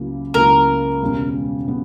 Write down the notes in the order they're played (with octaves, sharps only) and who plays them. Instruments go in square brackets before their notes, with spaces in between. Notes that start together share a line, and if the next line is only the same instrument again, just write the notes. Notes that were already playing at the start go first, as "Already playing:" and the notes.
Already playing: [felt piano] C#2 C#3 F#3 A#3 E4
[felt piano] C#2 C#3 F#3 A#3 E4 [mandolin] A#4
[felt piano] E1 E2 C#3 G3 B3
C#3 G3 B3